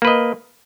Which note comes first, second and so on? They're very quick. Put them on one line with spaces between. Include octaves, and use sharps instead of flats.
A#3 B4 D#5